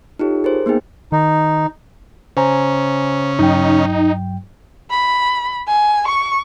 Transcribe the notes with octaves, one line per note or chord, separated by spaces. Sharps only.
D#4 F4 G4 A4 C#5
G#4 A#4 C5
A#3 B3 D#4 G#4 G5
D#3 D#4
C#3 C#4 C5 G#5 A#5
G2 F#3 D#4 G5
B5
G#5
C#6